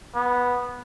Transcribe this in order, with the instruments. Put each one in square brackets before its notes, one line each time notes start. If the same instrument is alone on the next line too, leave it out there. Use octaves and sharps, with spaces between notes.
[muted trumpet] B3